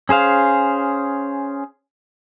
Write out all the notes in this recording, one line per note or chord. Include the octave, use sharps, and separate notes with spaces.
C#4 G#4 C5 F5